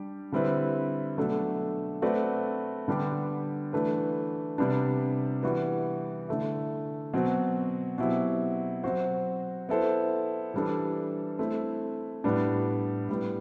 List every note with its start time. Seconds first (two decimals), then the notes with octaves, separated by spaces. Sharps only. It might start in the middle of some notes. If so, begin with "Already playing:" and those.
Already playing: G3 D4 G4
0.32 D3 G3 C4 E4 B4
1.17 B2 F#3 A3 D4 A4
2.02 A3 C4 F#4 B4 D5
2.88 D3 G3 B3 D4 G4
3.73 E3 A3 D4 F#4 B4
4.58 C3 G3 B3 D4
5.43 E3 G3 B3 F#4
6.28 D3 A3 E4
7.13 B2 F#3 C4
7.98 B2 F#3 C4 E4 G4
8.83 F#3 C4 F#4 C5
9.69 B3 E4 A4 C5
10.54 E3 G3 D4 A4
11.39 A3 C4 E4
12.24 A2 G3 B3 D4
13.09 A2 G3 B3